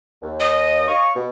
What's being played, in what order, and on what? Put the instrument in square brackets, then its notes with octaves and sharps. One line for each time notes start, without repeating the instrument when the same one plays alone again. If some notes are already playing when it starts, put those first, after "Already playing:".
[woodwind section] D#2
[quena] D#5
[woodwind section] C#5 F5 C#6
B2